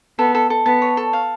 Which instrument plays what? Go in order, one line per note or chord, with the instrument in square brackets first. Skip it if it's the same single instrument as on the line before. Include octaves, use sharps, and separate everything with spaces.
[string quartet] B3 [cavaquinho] A4
[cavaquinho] A4
A4
[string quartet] B3 [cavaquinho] A5
[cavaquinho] C#5
A4
F5